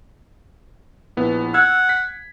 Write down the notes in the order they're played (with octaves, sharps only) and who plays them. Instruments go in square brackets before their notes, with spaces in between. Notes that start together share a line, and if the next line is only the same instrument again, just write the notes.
[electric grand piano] A#1 B3 E4
[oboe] F#5 [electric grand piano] E6 G#6
[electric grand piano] B6